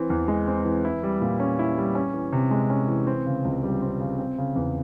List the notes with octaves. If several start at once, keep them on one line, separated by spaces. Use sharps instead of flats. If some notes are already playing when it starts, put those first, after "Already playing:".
Already playing: E3 C4
E2
G#3
C4
E3
E4
G3
A#2
C#4
E4
G3
C#4
E3
C3
G#3
C#4
E3
C4
C#3
C#2
G3
C4
C#3
C4
C#3
E2